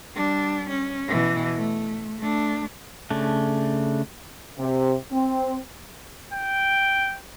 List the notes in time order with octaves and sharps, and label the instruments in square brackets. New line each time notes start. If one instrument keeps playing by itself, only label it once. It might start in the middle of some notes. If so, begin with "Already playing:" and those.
[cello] G3 D4
C#4
B2 E3
A3
A3 D4
[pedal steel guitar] C#3 A3 D4
[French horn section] C3
C4
[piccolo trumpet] G5